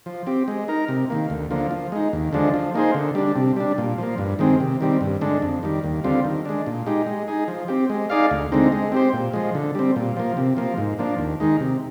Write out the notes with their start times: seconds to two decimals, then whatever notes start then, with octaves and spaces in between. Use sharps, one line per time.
0.06 F3
0.27 C4 G4
0.48 G#3
0.68 D#4 A#4
0.88 C3
1.10 D#3 A#3
1.30 D2
1.51 D3 F3 A#3
1.71 F3
1.92 G#3 D#4
2.13 D#2
2.33 D3 F3 G#3 D4
2.54 F3
2.74 A#3 D#4 G#4 C5
2.94 D3
3.15 G3 D4
3.36 C3
3.56 G3 D4
3.78 A#2
3.98 F3 A#3
4.18 G2
4.39 D#3 G#3 C4
4.60 C3
4.81 D#3 G3 C4
5.01 G2
5.21 D3 G#3 D4
5.42 F2
5.63 D#3 G3
5.84 D#2
6.04 D3 G3 C4 F4
6.25 D#3
6.45 G#3 D4
6.66 A#2
6.86 G#3 D#4 G4
7.06 G#3
7.28 D#4 G#4
7.48 F3
7.68 C4 G4
7.90 G#3
8.10 D#4 G#4 D5 F5
8.31 D2
8.52 D3 G#3 C4 D#4
8.72 G#3
8.92 C4 G4 C5
9.13 A#2
9.34 F3 G#3
9.55 D3
9.75 G3 C4
9.96 A#2
10.17 F3 A#3
10.37 C3
10.57 F3 A#3
10.78 G#2
10.99 F3 A#3 D4
11.19 D#2
11.40 D#3 G#3 D#4
11.60 C3